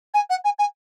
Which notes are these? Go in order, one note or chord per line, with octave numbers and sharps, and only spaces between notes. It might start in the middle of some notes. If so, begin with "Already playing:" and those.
G#5
F#5
G#5
G#5